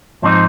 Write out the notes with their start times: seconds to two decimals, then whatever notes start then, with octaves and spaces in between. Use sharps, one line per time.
0.22 G#2 F3 C4 D#4